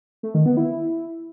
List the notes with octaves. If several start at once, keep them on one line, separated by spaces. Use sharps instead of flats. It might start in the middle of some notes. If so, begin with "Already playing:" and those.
A3
D#3
B3
E4